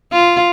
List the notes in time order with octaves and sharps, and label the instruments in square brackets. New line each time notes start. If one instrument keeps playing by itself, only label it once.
[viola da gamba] F4